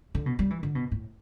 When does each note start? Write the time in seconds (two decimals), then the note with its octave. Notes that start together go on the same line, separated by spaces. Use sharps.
0.15 D3
0.26 B2
0.39 G3
0.50 E3
0.63 D3
0.75 B2
0.91 A2